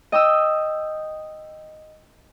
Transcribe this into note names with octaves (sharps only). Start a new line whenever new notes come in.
D#5 G5 D#6 E6